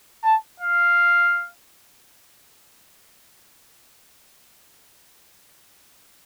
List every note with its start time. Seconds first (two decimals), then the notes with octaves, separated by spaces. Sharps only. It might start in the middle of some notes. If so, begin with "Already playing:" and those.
0.24 A5
0.60 F5